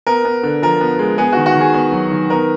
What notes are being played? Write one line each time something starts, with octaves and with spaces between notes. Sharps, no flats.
B3 A#4
B3
D3
F3 A#4
B3
G#3
B3 G#4
D#3 F#4
F#4
D#3
G#4
B3
F#3
D#3
B3 A#4